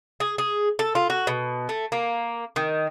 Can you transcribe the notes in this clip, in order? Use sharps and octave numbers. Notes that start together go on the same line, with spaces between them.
G#4
G#4
A4
F4
F#4
B2
A3
A#3
D#3